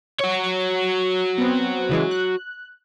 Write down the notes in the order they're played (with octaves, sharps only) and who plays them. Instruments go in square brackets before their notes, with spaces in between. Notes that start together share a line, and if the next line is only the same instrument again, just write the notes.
[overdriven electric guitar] F#4 C#5
[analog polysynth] B3 C4
C#3 E3 G#3
F#6